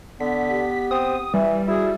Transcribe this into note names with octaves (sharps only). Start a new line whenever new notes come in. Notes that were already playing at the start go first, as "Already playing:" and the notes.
D3 B3 B6
G4
C4 D#6
E3 G3 E5
E4 F#4 G#4